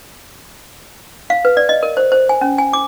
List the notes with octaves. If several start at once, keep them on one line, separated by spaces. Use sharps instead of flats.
F5
B4
D5
D#5
A#4
C5
C5
G#5
C#4
G#5
D6